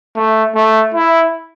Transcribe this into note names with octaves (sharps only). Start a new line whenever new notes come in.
A3
A3
E4